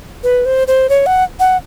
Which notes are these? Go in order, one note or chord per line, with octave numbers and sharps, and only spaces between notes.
B4
C5
C5
C#5
F#5
F#5